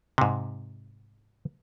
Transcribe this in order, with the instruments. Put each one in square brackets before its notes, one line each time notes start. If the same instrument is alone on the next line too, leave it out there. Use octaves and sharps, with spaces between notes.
[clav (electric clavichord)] G#2 C3